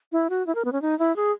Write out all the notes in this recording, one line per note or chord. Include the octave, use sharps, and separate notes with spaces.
E4
F#4
E4
A#4
B3
C#4
D#4
E4
G#4